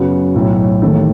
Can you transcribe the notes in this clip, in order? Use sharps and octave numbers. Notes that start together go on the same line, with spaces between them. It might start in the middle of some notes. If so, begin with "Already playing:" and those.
Already playing: F#2 C#3 F#3 B3
B1 A2 F#3
E1 D#2 D#3 A3